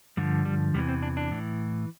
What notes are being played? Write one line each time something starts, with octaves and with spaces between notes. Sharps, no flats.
G2 D3 F3 G3
G3
E2 C3 E3 G3
C4
D4
D4
A2 E3